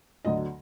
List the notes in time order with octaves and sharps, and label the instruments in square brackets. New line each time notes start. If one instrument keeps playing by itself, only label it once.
[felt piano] D2 D3 F#3 D#5